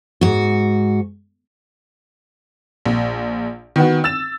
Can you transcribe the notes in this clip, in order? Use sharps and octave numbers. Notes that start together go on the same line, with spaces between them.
G#2 F#4
A#1
D#3 B3 F#4
E6 A6 E7